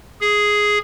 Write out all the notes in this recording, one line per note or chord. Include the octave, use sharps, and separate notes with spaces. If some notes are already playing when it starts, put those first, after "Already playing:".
G#4